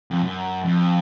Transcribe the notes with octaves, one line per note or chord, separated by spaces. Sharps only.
F2
F#2
F2